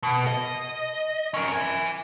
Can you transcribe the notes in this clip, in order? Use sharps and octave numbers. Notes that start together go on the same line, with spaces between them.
B2
D#5
C#4 A#4
E5 G#5